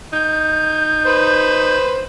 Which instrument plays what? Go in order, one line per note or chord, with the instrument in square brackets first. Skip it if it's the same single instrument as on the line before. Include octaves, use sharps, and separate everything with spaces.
[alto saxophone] D#4 [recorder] G6
[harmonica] B4 C5